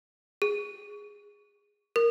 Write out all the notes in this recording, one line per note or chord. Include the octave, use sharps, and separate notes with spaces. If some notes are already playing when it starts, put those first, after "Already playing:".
G#4
A#4